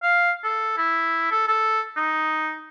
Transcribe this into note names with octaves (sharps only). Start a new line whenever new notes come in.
F5
A4
E4
A4
A4
D#4